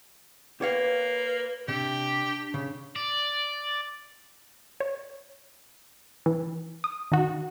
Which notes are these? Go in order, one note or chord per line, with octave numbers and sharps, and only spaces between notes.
A#3 G4 B4 C#5 F5
C3 D4 G4
C#3
D5
C#5
E3
D#6
D#3 D#4 F#4